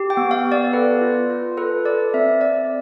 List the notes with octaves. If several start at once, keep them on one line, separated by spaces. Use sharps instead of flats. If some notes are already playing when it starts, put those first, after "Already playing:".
Already playing: G4
G5
B3
F5
B3
D5
A4 B4
F4
F4
A4 B4
A4 D5
C4 E5
C4 D5